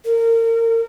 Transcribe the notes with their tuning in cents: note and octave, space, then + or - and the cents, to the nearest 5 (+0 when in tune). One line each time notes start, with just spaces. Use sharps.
A#4 -30